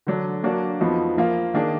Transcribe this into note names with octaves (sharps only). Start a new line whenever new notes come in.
D3 F#3 D4
F#3 A#3 D4 F#4
F2 F3 B3 D#4 F#4
F3 A#3 F4
D#3 A#3 D4 G#4